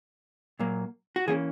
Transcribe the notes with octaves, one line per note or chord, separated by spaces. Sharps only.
A#2 F#3 A#3
F#4
E3 A#3 C#4 G#4